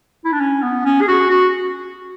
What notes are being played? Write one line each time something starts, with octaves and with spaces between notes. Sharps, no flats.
E4
D4
C#4
B3
C#4
G#4
F#4
F#4